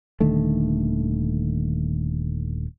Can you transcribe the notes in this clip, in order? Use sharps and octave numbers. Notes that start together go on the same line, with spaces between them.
D#1 D3 D#3 A3